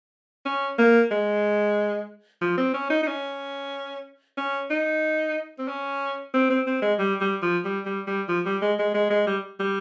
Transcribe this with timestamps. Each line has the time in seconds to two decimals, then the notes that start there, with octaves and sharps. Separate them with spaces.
0.45 C#4
0.78 A#3
1.11 G#3
2.41 F3
2.57 C4
2.73 C#4
2.90 D#4
3.03 D#4
3.07 C#4
4.37 C#4
4.70 D#4
5.59 C4
5.68 C#4
6.34 C4
6.50 C4
6.66 C4
6.82 G#3
6.99 G3
7.21 G3
7.42 F3
7.64 G3
7.85 G3
8.07 G3
8.28 F3
8.45 G3
8.62 G#3
8.79 G#3
8.94 G#3
9.11 G#3
9.27 G3
9.60 G3